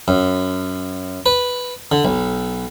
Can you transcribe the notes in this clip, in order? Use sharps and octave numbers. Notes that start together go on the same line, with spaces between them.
F#2
B4
D3
B1